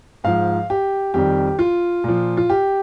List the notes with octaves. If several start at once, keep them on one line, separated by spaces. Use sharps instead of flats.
G#2 F3 F5
G4
F2 D#3 G3 G4
F4
A#2 F3
F4
G4